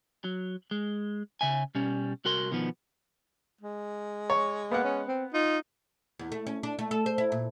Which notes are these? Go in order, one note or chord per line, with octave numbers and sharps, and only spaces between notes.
F#3
G#3
C#3 E5 G#5
B2 G3 C#4
C2 F#4 A#4 C6
B2 D#3 F3 B3
G#3
C#5
A#3 B3 F#5
C#4
C4
D#4 F4
E2
A3
C#4
D4
A3
A4
C5
E4
A#2